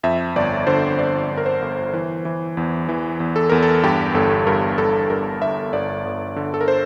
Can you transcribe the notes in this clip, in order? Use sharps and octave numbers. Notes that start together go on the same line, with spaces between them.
F2 E5
G1 D5
D3 C5
G1 D5
G1
A#4
C5
G1
E3
E3
E2
E3
E2
A4
E2 A#4
A4
G2 G4
G1 A4
G2 A#4
G2 A4
G2 A#4
G1 E5
G1 D5
G1
D3
A4
A#4
C5